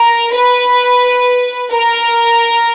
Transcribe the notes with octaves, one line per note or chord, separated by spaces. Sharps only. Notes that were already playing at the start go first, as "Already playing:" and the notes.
Already playing: A#4
B4
A#4